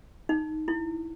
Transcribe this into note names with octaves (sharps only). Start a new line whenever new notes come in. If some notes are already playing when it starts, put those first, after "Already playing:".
D#4
E4